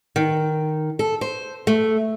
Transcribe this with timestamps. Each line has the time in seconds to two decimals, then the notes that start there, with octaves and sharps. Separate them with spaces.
0.16 D#3
0.99 A4
1.21 C5
1.67 A3